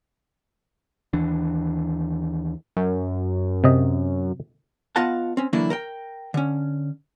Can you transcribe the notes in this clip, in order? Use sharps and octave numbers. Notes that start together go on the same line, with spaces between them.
D#2 E3 D4
F#2
C3 D#5
B3 F4 D#5 F5 F#5 A5
C4 C#4
D3 E3 F#3 A#3 D4 E4
A#4 G5
D3 C#4